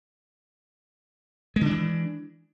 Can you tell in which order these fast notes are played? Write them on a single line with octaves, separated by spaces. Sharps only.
G#3 D3 D4 E3